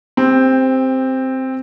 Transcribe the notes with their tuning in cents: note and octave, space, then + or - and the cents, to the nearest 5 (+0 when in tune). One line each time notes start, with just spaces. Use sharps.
C4 +0 G4 +25